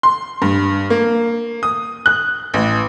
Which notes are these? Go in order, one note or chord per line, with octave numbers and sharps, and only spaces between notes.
C6
G2
A#3
D#6
F#6
A1